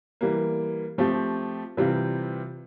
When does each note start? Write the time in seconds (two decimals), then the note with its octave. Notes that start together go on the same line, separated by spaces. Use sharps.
0.21 E3 G3 A#3
0.98 F3 A3 C4 G4
1.77 C3 E3 G3 C4 F4